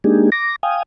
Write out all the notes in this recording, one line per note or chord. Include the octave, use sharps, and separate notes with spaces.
G#3 A#3 D4 D#4 G4 G#4
D6 A#6
F5 G5 G#5 D#6